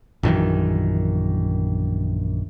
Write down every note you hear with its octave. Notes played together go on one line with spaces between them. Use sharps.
A#1 F#2 D#3 E3